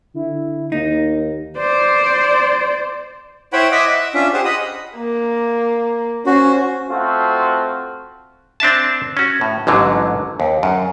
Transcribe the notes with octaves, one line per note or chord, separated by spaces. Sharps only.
D3 E4
D#2 A#3 D#4
C5 D5
E4 C5 C#5 F#5 G5 B5
D#5 E5 F#5 D6 E6
E5 F#5
C#4 D4 F4 E5
G4 G#4 C5 F#5
D#5 F#5 B5 D#6
A#3
C#4 F#4 C5
A3 C4 F4 F#4
C4 D4 E5 A5
C#4 F#4
A2
A1 G#2 D3 F#3
D#2
F#2